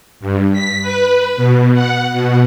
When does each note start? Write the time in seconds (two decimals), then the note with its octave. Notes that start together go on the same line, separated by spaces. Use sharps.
0.20 G2
0.52 B6
0.82 B4
1.37 B2
1.74 F#5
2.13 B2